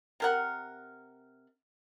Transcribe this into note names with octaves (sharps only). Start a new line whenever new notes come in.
C3 A#4 F#5